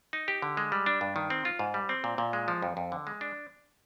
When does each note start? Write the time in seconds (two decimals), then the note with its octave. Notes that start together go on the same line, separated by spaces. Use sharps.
0.13 D#4
0.28 G4
0.42 D3
0.57 G#3
0.72 G3
0.86 D4
1.01 G2
1.16 D#3
1.30 C4
1.45 F4
1.59 G#2
1.74 G3
1.89 C4
2.04 A#2
2.18 A#2
2.33 G#3
2.48 F3
2.62 F2
2.77 F2
2.92 D3
3.07 G#3
3.21 D4